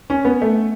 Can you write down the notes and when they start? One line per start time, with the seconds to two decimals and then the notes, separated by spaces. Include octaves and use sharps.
0.10 C#4
0.25 B3
0.42 A3